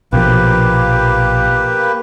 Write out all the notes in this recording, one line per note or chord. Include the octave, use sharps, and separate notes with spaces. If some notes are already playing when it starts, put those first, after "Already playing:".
A#1 B2 F3 A#3 G4 B4